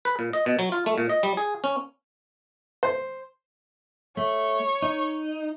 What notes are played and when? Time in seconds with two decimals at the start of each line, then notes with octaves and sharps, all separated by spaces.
0.05 B4
0.19 A#2
0.33 D#5
0.46 B2
0.59 F#3
0.72 F4
0.86 A3
0.98 A#2
1.09 D#5
1.23 G3
1.37 G#4
1.64 C#4
2.83 C5
4.17 A3 C#5
4.82 D#4